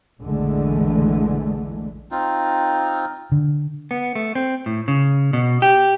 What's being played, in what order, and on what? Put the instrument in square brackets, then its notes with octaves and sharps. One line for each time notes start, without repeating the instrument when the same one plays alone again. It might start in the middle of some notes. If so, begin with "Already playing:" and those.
[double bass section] A#1 E2 D3 E3 G#3 A3
[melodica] C4 D#4 F4
[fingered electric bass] D3
[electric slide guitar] B3
A3
C4
A2
C#3
B2
G4